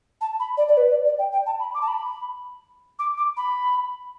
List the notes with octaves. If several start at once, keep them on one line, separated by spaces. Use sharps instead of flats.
A5
B5
D5
D5
B4
D5
D5
G5
G5
A5
B5
D6
A5
B5
D6
D6
B5